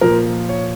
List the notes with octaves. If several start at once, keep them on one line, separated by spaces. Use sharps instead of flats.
A#2 F3 A#4
C#5